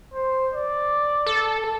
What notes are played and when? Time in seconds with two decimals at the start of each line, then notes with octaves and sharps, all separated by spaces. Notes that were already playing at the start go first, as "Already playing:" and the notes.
0.14 C5
0.54 D5
1.26 A4